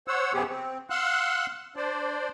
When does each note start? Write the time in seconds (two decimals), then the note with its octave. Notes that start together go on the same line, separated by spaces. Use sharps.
0.08 C5 C#5 F#5 E6
0.34 F#2 C3 F3 B3 G4 G#4
0.48 C4
0.90 F5 F#5 C6 E6 F#6
1.76 D4 C5 D5